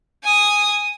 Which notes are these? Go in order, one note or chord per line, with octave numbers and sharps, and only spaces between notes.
G#5 D#6